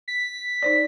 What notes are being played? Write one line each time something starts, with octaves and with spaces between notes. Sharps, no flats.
B6
D#4 C5 D5